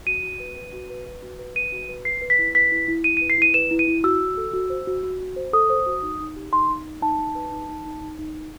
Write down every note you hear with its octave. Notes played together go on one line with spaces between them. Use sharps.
F#4 D#7
F#4
B4
B4
F#4
B4
B4
F#4
B4
B4 D#7
F#4
B4
B4 C7
B4
B6
E4
B4 B6
E4
E4
E4 D#7
D#7
B4
C7
E4 D#7
B4 E7
E4
D#7
E4
F#4 E6
F#4
A4
F#4
C5
F#4
F#4
F#4
C5
A4 D#6
C5
F#4
D#4
D#4
G4
D#4 C6
D#4
D#4
D#4 A5
D#4
B4
D#4
D#4
D#4
D#4
D#4
D#4